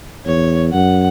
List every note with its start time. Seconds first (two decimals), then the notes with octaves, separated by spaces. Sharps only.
0.25 E2 C#5
0.73 F#2 F#5